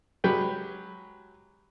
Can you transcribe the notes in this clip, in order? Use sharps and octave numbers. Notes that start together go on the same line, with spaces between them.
F#3 G#3 G4 B4 G5